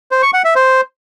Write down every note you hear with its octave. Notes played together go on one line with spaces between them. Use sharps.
C5
C#6
F#5
E5
C5